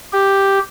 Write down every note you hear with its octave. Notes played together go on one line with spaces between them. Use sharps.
G4